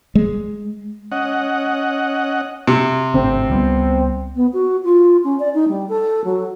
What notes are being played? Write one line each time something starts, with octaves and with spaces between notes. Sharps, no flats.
G#3
C#4 D#5 F#5
C3
G#1 A2 D3 C4
C#2 G3 B3
B3
F#4
F4
C#4
D5
D#4
G3
A4
F#3